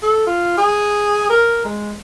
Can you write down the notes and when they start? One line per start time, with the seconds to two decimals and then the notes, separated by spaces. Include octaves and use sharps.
0.03 A4
0.27 F4
0.58 G#4
1.30 A#4
1.65 G#3